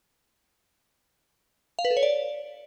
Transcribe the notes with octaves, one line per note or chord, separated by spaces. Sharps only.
F5
B4
A4
C#5
D5